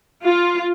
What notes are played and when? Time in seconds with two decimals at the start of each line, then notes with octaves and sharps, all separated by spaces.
0.24 F4